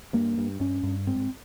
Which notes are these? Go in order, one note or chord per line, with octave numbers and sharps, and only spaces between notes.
G2 A#3
G2
G2 C#4
G2
G#2 C4